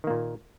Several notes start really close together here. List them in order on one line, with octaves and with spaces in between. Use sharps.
D#3 A#3 A#2